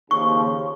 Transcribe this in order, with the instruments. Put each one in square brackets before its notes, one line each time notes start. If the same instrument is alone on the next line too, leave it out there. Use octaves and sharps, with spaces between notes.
[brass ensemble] D#2 C#3 F3 [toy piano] C#6